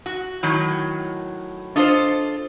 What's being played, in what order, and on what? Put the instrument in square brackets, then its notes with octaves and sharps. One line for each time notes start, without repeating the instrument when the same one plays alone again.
[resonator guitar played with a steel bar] F#4
A2 D#3 F#3
[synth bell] D4 C5 [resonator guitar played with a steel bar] F4 A4 D#5